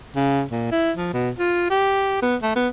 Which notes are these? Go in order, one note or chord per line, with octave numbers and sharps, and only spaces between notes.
C#3
A#2
E4
F3
B2
F4
G4
B3
A3
B3